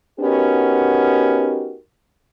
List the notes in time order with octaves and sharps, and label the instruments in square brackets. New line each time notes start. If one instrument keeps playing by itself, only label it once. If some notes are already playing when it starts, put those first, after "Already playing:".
[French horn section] B3 C#4 D#4 F#4 G4 A#4